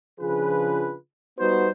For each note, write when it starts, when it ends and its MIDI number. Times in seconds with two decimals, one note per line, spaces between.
0.20 0.95 49
0.20 0.95 53
0.20 0.95 62
0.20 0.95 65
0.20 0.95 68
0.20 0.95 71
1.39 1.68 55
1.39 1.68 59
1.39 1.68 63
1.39 1.68 66
1.39 1.68 71
1.39 1.68 72